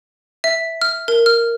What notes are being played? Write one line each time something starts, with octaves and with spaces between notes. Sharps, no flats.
E5
F6
A#4
F6